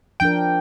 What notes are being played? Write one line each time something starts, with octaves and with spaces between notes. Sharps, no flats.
F3 D4 A#4 G5